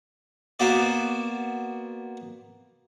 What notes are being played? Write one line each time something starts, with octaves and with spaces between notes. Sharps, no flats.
A#3 B3 F#4 C5 D5